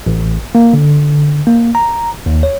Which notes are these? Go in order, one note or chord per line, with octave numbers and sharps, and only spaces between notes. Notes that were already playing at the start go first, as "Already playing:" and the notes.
A1
A#3
D3
A#3
A#5
D#2
C#5